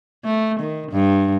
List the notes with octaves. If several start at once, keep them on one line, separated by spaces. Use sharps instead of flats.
A3
D#3
G2